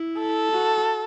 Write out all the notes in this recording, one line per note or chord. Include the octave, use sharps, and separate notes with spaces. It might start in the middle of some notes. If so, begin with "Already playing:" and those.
Already playing: E4
A4
F#4